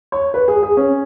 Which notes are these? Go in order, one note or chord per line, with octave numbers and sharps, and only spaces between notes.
C#5
B4
G#4
G#4
C#4